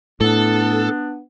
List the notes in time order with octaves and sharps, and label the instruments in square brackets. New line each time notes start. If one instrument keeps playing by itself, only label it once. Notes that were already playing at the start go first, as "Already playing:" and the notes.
[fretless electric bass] A2 [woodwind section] B3 D4 [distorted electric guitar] A4